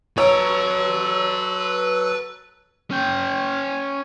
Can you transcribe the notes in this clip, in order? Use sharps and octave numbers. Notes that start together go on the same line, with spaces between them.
F#3 A4 B4 C#5 A#5
C#4 G5